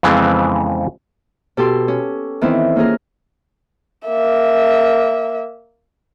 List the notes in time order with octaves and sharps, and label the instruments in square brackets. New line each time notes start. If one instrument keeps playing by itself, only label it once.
[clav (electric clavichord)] F2 C#3 E3 G#3 B3 C4
[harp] B2 G4 A4 C6
C#4
D#3 E3 B3 C4 E4
A#3 C#4 F4 G#4 A#4
[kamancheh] A#3 E5